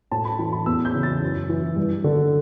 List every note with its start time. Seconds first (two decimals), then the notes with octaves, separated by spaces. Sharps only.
0.12 A2 A5
0.25 B5
0.39 E3 A5
0.52 B5
0.66 E2 E6
0.85 G6
0.94 C#3 E3
1.03 A6
1.22 F#2
1.50 E3
1.76 G2
2.04 D3